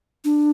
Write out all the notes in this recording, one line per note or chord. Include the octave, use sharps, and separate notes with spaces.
D4